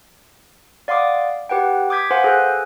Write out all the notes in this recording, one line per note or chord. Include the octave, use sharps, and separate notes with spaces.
D5 F5 F#5 C6 D6 D#6
G4 B4 F#5 G5
D6 D#6 G6 G#6 B6
B4 C5 F5 F#5 G#5 C6
G#4 A4 G#5 F#6 G6